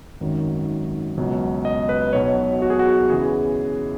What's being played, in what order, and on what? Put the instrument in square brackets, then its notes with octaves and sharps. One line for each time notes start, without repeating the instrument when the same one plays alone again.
[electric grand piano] G#1 F#2 D#3 F#3
C#2 B2 F#3
D#5
B4
B1 B2 F#3 C#5
F#4
G#4
F#4
E2 C#3 E3 G#4